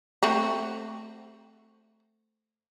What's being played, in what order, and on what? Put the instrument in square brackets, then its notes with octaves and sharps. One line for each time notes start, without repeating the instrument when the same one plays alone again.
[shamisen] A3 C4 F#4